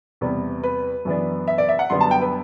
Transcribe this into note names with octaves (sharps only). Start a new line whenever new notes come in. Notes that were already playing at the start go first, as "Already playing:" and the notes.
E2 C3 G3 B3
B4
F#2 E3 B3 D4
E5
D5
E5
F#5
F#2 D3 G3 B3 C6
A5
G5
B4